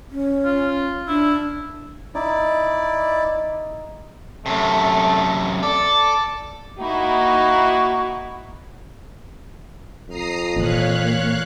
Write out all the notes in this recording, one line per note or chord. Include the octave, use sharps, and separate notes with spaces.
C#4
F4
D4 E4
D#4 E4 D5
F#2 C3 A3
A4 D5
A#3 D#4 E4 F#4
F2 A#5 D#6 C7
A#2 E3 C#5 F5 F#6